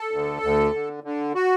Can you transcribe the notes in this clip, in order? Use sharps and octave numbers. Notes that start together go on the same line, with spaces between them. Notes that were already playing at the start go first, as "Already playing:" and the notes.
Already playing: A4
D2
D2
D3
D3
F#4